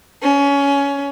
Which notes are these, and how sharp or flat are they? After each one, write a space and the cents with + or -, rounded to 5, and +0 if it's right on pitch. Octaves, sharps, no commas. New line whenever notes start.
C#4 +20